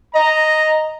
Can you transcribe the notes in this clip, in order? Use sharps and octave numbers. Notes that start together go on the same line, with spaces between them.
D#5 A#5